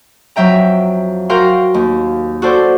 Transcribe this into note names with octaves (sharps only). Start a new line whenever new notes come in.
F2 F#3 E5 G5 A#5
F#4 A#4 F5 G5 C6
D#2
F#4 A4 C5 D5